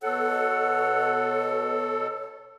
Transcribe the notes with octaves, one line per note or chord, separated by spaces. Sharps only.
B2 A4 C#5 F#5